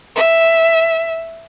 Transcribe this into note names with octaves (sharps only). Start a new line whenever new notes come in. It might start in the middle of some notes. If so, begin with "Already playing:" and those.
E5